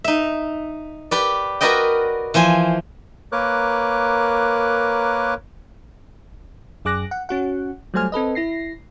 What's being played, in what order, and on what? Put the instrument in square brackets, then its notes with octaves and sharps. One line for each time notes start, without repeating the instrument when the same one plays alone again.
[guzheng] D#4 E5
G4 B4 D5
F#4 A#4 B4 D5 D#5 G5
E3 F3 C5 G#5
[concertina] A#3 A#4 B4 C#5 D6 F#6
[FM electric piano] F#2 G#4 D6 F#6 A#6
F#5
C#4 F#4 F#5
F#3 G3 A3 C5 G#5 F6
C4 A4 B4 D#5
E4 A#6 C7